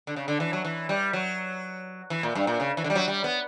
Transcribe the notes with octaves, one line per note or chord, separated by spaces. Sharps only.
D3
C#3
D3
E3
F#3
E3
G3
F#3
E3
A#2
G2
A#2
C#3
E3
D3
G3
F#3
G3
B3